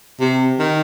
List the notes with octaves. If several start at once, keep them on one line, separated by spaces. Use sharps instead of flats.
C3
D#3